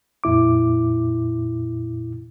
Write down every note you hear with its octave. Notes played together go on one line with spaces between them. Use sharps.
F2 A#2 E4 D6